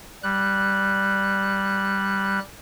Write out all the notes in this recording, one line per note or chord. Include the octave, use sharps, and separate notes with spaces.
G3 F#6